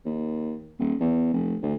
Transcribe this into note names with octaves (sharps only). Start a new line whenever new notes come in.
D#2
D#1
E2
F1
D2